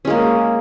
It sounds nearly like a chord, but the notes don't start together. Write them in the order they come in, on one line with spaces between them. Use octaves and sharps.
C#4 G#3 A#3